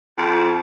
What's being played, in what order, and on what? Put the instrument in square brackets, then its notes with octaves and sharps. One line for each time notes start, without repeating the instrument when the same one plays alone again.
[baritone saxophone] F2